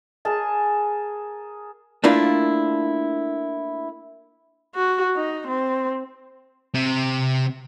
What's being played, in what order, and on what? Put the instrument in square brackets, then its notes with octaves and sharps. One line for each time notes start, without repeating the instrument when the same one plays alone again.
[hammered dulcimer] G#4 A#4 A5
[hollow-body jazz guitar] A3 A#3 D4 E4 F4
[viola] F#4
D#4
C4
[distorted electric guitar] C3